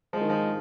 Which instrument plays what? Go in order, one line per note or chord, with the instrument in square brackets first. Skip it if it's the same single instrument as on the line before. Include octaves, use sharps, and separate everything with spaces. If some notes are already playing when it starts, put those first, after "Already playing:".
[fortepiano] F3 [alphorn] G#3
[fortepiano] D#3
F3